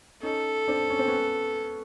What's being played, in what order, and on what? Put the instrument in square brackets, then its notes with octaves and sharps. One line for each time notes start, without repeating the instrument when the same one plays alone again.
[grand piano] C#4 D#4 [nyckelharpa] A4
[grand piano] C4 D4
C#4
C4
B3 C#4